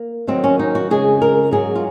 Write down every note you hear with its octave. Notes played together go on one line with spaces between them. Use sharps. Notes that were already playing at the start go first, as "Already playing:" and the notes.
Already playing: A#3
D#2 D#3 F#3 C4
C#4
D#4
F#4
F2 C#3 G#3 G#4
A#4
G#2 F#3 G#4
F4